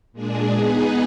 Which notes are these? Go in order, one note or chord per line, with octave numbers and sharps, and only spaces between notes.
A#2 G#3 D4 G#4
B3 D#4 G#4 B4